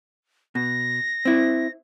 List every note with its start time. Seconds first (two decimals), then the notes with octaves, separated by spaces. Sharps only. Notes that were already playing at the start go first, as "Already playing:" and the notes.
0.55 B2 A#6
1.25 C4 E4